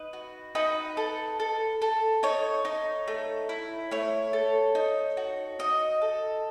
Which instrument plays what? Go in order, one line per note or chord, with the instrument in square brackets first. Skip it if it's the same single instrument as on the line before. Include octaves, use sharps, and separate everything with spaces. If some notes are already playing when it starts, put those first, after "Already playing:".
Already playing: [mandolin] D#4 B4
F#4
D#4 B4
A4
A4
A4
D#4 C#5
D#4
A3
E4
A3 C#5
A4
D#4
F#4
D#4 D#5
A4